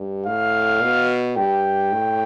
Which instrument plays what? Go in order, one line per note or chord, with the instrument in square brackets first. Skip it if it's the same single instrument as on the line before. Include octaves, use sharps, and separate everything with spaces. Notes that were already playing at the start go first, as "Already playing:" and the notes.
Already playing: [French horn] G2
[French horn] A2 [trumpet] F5
[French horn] B2
[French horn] G2 [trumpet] G5
[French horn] A2